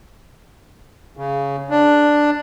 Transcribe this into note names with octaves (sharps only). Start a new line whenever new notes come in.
C#3
D4